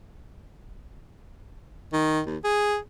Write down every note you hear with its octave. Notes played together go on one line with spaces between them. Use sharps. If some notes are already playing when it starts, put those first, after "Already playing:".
D#3
D#2
G#4